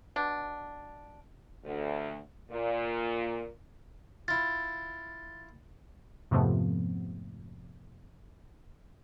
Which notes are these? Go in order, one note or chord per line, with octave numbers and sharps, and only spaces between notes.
B2 D4
D2
A#2
E4 F4 A6
F2 G#2 C3 F3 A3 B3